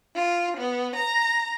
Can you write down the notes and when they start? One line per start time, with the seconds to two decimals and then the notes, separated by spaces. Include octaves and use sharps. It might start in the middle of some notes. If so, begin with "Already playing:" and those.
0.15 F4
0.58 B3
0.96 A#5